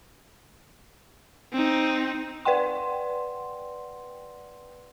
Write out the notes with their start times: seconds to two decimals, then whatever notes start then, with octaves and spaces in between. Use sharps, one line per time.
1.53 C4 D#4
2.45 B4 D5 F#5 G5 C6